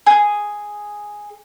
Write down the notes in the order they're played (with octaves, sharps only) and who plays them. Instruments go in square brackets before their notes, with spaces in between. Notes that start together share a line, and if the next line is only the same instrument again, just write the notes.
[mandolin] G#4